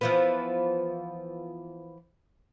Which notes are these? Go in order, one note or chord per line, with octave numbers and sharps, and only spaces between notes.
E3 F3 B3